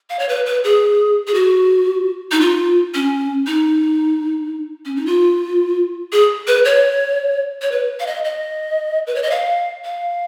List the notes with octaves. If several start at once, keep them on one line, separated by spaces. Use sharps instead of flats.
F5
C#5
B4
B4
G#4
G#4
F#4
D#4
F4
C#4
D#4
C#4
D#4
F4
G#4
B4
C#5
C#5
B4
F5
D#5
D#5
B4
C#5
D#5
F5
F5